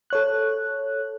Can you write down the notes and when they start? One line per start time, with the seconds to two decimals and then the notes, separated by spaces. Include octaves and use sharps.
0.10 A4 C#5 F#6